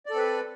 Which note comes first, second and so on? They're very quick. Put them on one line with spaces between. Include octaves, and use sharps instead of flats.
D5 A4 C4 B4